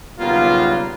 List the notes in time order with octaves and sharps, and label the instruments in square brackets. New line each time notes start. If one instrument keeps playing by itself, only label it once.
[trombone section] B1 C#3 G3 A#3 B3 F4